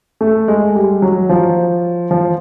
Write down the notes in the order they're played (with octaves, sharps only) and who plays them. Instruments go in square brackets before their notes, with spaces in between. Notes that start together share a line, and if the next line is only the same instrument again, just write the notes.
[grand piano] A3
G#3
G3
F#3
F3
F3